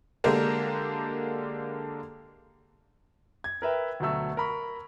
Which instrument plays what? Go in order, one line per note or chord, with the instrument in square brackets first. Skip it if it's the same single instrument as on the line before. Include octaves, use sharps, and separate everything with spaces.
[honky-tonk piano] D3 G#3 A#3 D4 G4 A#4
[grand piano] G#6
A#4 B4 E5 G5
D2 B2 F#3 A3 E6
A#4 B5 C#6